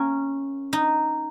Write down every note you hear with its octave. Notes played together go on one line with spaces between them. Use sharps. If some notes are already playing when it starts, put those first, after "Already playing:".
Already playing: A#3 C#4
D#4